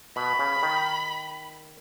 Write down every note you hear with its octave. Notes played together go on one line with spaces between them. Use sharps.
B2 B5
C#3
D#3